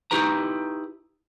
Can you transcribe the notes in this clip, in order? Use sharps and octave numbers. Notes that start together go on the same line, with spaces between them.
D#4 E4 G4 B4 A#5